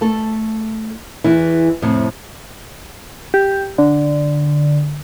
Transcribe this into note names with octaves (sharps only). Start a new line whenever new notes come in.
A3 A4
E2 E3 E4
F2 A2 C3
G4
D3